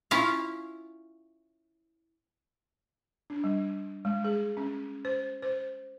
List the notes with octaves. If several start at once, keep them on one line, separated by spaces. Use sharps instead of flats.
C#4 E4 F4 F5
D4
G3
G#3
G#4
C#4
C5
C5